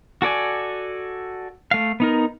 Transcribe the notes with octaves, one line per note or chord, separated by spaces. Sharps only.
F#4 A4 D5 G#5
A3 F5
B3 D#4 A#4